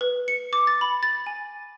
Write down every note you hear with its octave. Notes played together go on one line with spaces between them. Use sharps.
B4
C#7
D6
A6
B5
A6
G#5